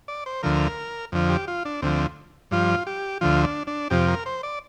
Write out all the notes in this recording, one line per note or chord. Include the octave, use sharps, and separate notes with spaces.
D5
C5
D2 D3 F3 A#4
F2 D3 F3
G4
F4
D4
D2 D3 F3 C4
G2 F3 F4
G4
D2 D3 F3 F4
D4
D4
F2 C3 F3 G4
A#4
C5
D5